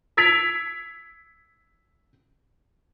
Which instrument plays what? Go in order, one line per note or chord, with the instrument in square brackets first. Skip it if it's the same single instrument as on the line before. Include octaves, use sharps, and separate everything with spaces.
[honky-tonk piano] E6 G#6 B6 C7 D7 F7